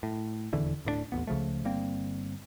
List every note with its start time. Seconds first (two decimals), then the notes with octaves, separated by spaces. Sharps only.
0.03 A2
0.53 D#1 E2 D3 E3
0.85 D1 A2 A3 D4
1.12 A1 D#2 A#2 B3
1.27 C#2 C#3 F3 A3
1.64 G1 G3 A#3 C4